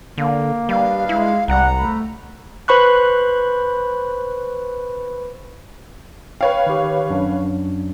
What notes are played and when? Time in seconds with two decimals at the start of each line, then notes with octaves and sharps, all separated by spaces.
0.18 D3 A#3
0.69 G3 D4 B4 D#5 F5
1.09 G#3 E4
1.48 C2 G3 F#5 A#5
1.77 A3 B5
2.68 B4 C5 B5 C#6 F#6
6.41 B4 C#5 F5 G5
6.67 D#3 G4
7.10 F#2 D4